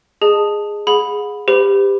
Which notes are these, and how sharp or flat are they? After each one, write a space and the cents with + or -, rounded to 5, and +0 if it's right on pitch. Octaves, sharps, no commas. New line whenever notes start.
G#4 -5 D#5 -15 A5 +0
G#4 +0 F#5 -35 B5 +0
G4 +20 C5 -45 B5 +5